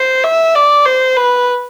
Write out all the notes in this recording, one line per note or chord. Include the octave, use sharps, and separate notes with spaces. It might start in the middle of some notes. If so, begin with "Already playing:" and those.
Already playing: C5
E5
D5
C5
B4